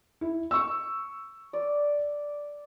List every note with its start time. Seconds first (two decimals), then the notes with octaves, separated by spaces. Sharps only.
0.21 E4
0.51 C#6 E6
1.53 D5